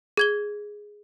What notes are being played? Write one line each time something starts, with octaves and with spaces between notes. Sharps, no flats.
G#4 G#6 G7